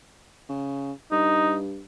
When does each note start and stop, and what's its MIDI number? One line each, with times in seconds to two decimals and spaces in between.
0.49 0.92 49
1.11 1.83 43
1.11 1.57 63